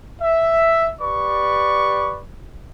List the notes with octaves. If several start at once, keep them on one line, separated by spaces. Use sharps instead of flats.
E5
G4 B4 D5 C#6